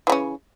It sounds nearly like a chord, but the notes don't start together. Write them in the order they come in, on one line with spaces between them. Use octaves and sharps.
E3 C#3 C#4